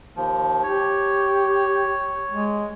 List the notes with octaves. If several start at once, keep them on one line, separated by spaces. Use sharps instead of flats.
D#2 F3
G4 C#5
G#3